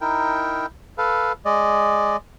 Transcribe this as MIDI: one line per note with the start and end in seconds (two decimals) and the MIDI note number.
0.01 0.66 63
0.01 0.66 64
0.01 0.66 70
0.01 0.66 79
0.98 1.32 69
0.98 1.32 71
0.98 1.32 77
1.45 2.17 56
1.45 2.17 74
1.45 2.17 75